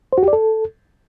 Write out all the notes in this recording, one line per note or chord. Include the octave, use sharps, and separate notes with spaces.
C5
F#4
G4
D5
A4